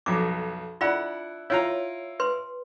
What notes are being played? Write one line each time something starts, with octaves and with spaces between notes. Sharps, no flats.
B1 F2 D6
D4 E4 F4 F#5 B5
E4 F4 C#5 A#5
B4 C6